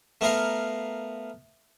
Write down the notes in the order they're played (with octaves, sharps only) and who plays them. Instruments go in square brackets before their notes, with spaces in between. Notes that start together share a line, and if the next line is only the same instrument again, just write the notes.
[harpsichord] A3 B3 A#4 F5